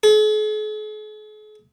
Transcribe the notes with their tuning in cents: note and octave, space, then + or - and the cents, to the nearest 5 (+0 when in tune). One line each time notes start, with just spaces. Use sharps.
G#4 +45